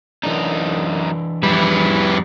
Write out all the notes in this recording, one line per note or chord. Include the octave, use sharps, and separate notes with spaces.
F#2 E3 D4 D#4
F2 G3 E4 B4